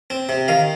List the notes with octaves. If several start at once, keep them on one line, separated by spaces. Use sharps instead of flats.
C4
C3
D#3 F5